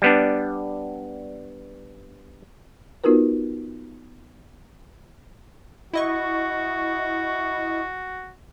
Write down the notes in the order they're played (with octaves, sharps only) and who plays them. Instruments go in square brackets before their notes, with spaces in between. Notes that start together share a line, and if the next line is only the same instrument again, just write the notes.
[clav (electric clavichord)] G3 B3 D4
[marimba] B3 D#4 F4 F#4 A#4 B4
[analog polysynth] E4 D#5 C#6 [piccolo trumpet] F#4